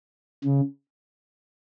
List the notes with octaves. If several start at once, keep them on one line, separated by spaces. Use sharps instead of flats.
C#3